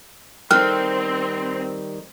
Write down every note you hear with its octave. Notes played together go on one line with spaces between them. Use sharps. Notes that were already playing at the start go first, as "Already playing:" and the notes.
D#3 G3 C4 G5 F6 F#6